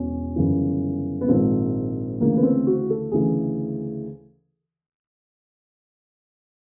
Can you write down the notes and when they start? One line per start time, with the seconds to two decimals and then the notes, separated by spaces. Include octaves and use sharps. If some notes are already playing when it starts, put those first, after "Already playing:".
Already playing: E1 E2 B2 C#4
0.36 G1 F#2 C#3 E3
1.21 B3
1.28 A#1 G#2 D#3 C4
2.20 D2 C#3 E3 A#3
2.37 B3
2.43 C4
2.67 F#4
2.90 A4
3.12 D2 C#3 E3 G#4